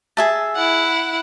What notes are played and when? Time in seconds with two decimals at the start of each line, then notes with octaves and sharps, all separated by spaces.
0.17 G#4 E5 A5
0.55 E4 F#5